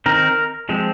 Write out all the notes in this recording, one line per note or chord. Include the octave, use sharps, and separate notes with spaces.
D#3 C4 D#4 A#4
F3 G#3 C4